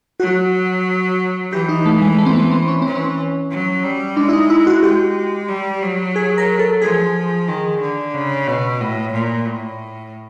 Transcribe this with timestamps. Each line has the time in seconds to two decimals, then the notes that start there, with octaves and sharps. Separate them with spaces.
0.20 F#3 F#4
1.52 E3 G4
1.69 D#4
1.86 A3
2.02 G#3
2.18 A3
2.26 C4
2.35 B3
2.51 C4
2.68 C#4
2.82 E3 C4
2.95 C#4
3.50 F#3
3.84 G3
4.16 G#3 D4
4.29 E4
4.33 D#4
4.50 E4
4.67 F#4
4.83 G#3 G4
5.48 G3
5.83 F#3
6.16 G#4
6.38 A#4
6.59 A4
6.81 F3 G#4
7.48 D#3
7.81 D3
8.14 C#3
8.47 B2
8.81 A2
9.13 A#2
9.46 A2